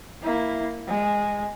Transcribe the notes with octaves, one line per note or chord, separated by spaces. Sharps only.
A#3 E4
G#3